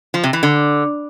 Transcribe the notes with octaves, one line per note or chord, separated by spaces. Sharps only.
F3
C3
E3
D3